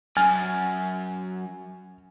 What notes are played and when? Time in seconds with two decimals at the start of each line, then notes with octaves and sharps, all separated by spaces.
0.17 F#2 G#5 F6 A6